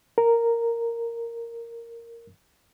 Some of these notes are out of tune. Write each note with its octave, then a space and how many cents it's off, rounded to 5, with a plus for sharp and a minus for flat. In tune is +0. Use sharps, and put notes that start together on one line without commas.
A#4 -5